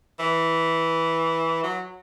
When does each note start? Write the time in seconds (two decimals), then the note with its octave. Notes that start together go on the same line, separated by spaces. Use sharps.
0.19 E3
1.63 F#3